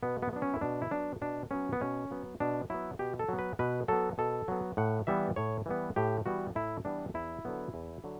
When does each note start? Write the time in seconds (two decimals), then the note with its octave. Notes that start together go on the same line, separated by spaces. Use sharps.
0.03 B2 B3
0.22 B3
0.33 F#3 B3 D4
0.42 C#4
0.54 E4
0.61 B2 D4
0.82 E4
0.91 F#3 B3 D4
1.21 B2 D4
1.51 F#3 B3 C#4
1.73 B3
1.81 B2 C#4
2.11 F#3 B3
2.40 B2 D4
2.70 F#3 B3 E4
2.99 B2 G4
3.19 A4
3.29 F#3 B3
3.39 B4
3.59 B2 B4
3.88 F#3 B3 A4
4.18 B2 A4
4.48 F#3 B3
4.77 A2 F#5
5.07 E3 G3 B3 E5
5.36 A2 C#5
5.66 E3 G3 B3
5.96 A2 G4
6.26 E3 G3 B3 F#4
6.55 A2 E4
6.85 E3 G3 B3 D4
7.14 E2 E4
7.45 D3 F#3 B3
7.74 E2
8.04 D3 F#3